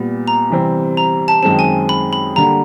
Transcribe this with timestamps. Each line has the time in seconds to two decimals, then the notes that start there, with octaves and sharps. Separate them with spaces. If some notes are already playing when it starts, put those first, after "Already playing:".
Already playing: A#2 G3 B3
0.28 A#5
0.50 C3 E3 G3 C4
0.97 A#5
1.28 A5
1.43 F#2 D#3 G#3 C4 A5
1.59 G#5
1.89 B5
2.13 B5
2.36 D3 G3 A#3 A#5